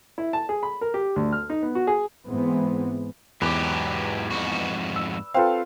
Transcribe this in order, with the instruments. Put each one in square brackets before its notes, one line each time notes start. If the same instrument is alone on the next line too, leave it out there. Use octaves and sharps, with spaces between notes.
[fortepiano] E4
A5
G#4
B5
A#4
G4
D2
F6
D#4
B3
F#4
G#4
[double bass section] G#2 E3 G#3 B3 C4
[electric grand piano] E2 [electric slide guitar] G#2 F#3 G4 [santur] B4 D5
[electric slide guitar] F2 G#2 F#4
[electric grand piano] E6
[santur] C4 F4 [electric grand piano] A4 B4 F5